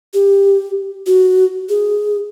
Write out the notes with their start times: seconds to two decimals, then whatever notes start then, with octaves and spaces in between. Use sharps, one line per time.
0.14 G4
1.06 F#4
1.69 G#4